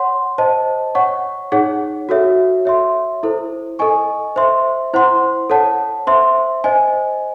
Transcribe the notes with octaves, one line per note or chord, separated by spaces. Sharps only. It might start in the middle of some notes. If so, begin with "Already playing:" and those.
Already playing: C#5 F#5 C6
C5 D#5 A5
C#5 F#5 C#6
D#4 G#4 C#5 F#5
F#4 A4 C#5 E5
C#5 E5 C6
E4 A4 C5
A4 D#5 G#5 C#6
C5 E5 C6
E4 C5 F#5 C6
A4 C#5 F#5 A5
C5 E5 C6
C5 D#5 G#5